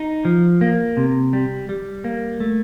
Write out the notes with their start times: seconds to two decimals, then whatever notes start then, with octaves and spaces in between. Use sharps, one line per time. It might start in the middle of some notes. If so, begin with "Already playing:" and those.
Already playing: D#4
0.25 F3
0.61 A#3
0.97 C3
1.33 G3
1.69 G3
2.04 A#3
2.40 A3